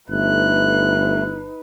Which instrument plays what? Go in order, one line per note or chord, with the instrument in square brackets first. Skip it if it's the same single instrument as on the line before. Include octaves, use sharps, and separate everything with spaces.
[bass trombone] G1 [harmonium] A3 [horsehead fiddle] D#4 B4 [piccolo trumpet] F#6